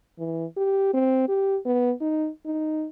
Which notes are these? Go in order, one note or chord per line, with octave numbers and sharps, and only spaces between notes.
E3
G4
C4
G4
B3
D#4
D#4